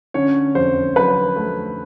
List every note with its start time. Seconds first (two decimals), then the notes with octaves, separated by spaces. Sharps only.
0.14 D3 C#4 C#5
0.55 F2 C5
0.96 F#3 B4
1.36 A3